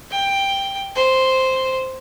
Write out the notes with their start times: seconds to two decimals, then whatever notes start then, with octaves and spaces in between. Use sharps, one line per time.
0.10 G5
0.95 C5